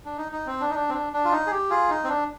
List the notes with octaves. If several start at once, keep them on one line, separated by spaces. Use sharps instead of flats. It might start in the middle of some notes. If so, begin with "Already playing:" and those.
D4
D#4
D#4
C4
D4
D#4
D4
C4
D4
D4
F4
D#4
G#4
G4
F4 G#4
D#4
C4
D4